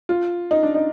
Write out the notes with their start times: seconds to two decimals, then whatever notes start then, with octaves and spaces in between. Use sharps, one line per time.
0.09 F4
0.51 D#4
0.63 D4
0.75 D#4